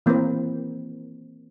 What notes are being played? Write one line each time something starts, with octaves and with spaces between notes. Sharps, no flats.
E3 A#3 C4 A#4 B4